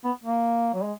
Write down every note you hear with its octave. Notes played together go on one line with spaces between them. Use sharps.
B3
A#3
F#3
G#3